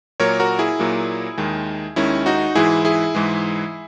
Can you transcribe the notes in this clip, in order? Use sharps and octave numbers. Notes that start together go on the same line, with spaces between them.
A#2 F#3 A#3 A#4 C#5
F#4 A#4
E4 G#4
A#2 F#3 A#3
D#2 D#3 G#3
D#2 D#3 G#3 C#4 E4
D#4 F#4
G#2 E3 G#3 E4 G#4
E4 G#4
G#2 E3 G#3